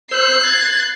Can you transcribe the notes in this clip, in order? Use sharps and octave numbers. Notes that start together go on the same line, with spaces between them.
C5 E6 F#6 C7
G#6 A6